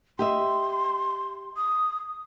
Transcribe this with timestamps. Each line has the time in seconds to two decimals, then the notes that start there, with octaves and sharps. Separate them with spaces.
0.19 G4 D#5 E5 C6
1.57 D#6